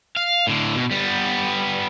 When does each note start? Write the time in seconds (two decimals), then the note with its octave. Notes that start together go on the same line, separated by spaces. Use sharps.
0.16 F5
0.47 A2 D3
0.76 B2
0.91 G3 B3